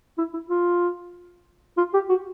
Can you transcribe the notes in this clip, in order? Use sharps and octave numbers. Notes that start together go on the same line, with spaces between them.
E4
E4
F4
F4
G4
F#4